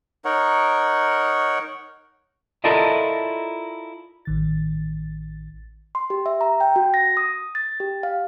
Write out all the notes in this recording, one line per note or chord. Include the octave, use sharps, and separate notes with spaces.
D#4 A#4 C#5 F#5
E4 F4 A4 A#4 D5 D#5
A1 D#3 A6
C6
G4
E5
A#5
G5
F#4
A#6
D#6
A6
G4
F5